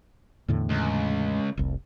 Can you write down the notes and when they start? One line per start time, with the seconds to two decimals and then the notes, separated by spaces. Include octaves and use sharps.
0.48 E2 A2 D3
0.70 C#2
1.57 F1 C2